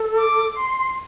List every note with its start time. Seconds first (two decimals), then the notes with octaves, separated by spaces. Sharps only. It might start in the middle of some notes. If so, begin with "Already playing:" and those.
Already playing: A4
0.18 D6
0.56 C6